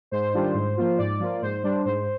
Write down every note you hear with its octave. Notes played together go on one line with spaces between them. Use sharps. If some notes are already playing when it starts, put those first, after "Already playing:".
G#2 C5
D#3 G3 D4 F4
G#2
F3 A#3 F4
G#2 D5
F3 A#3 F4
G#2 C5
G3 D4
G#2 C5